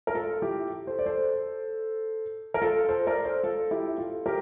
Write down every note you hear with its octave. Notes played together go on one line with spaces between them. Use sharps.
A#4
F4 A4
E4 G4
A4 C5
D5
A4 C5
A#4
F4 A4
A4 C5
A#4 D5
A4 C5
F4 A4
E4 G4
F4 A4
G4 A#4